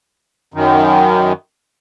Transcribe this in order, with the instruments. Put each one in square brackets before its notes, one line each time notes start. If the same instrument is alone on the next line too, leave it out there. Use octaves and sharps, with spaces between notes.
[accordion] F#2 D#3